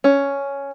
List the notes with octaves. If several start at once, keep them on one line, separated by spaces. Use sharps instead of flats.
C#4